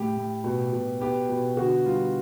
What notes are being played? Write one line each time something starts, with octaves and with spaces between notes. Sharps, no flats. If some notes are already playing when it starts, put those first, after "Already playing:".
Already playing: A2 G4
A2
B2
B2
B3 G4
B2
D3 F#4
G3 F4